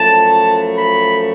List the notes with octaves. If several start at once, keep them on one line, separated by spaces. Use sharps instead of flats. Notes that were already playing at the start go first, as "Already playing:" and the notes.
Already playing: F#2 F3 A3 A5
B5